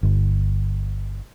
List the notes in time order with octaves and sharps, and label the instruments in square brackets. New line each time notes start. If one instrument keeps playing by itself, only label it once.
[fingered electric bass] G1